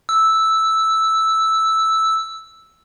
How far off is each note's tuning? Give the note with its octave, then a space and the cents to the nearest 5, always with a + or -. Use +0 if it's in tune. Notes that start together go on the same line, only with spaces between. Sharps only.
E6 -5